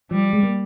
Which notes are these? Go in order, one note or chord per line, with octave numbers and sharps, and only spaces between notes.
F3 G3
G#3
A#3